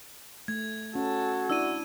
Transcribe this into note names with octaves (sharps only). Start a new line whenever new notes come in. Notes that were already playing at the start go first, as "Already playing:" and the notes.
A3 G#6
C#4 F#4 A4
D4 E4 D5 E6 D#7